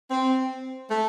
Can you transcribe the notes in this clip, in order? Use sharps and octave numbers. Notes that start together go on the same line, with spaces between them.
C4
A3